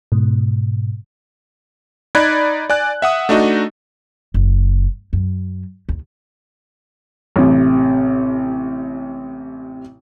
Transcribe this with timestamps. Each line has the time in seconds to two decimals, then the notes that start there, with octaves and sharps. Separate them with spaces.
0.12 G#2 B2
2.15 D#4 D5 B5 F#6 G#6
2.70 D5 G#5 F#6
3.02 E5 F#5 D#6
3.29 A3 D4 D#4 F#4 D#5
4.34 F#1
5.13 F#2
5.89 D#2
7.36 A1 C3